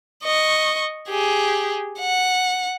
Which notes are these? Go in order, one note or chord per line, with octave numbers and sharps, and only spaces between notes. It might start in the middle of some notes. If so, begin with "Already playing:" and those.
D#5 C#6
G4 G#4
F#5